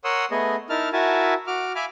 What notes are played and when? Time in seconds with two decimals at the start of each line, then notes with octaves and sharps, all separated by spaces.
0.04 A#4 C#5 F#5 C6 D#6 E6
0.31 A3 B3 G#4 D#5
0.70 D#4 E4 A#4 A5 F6
0.93 E4 F#4 A#4 E5 G#5 A5
1.47 F#4 D6 F6
1.75 E5 F5 G#5 B5 D6 F6